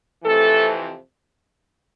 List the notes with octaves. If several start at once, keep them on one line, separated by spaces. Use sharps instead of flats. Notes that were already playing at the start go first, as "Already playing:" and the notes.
F2 C3 E3 A3 A4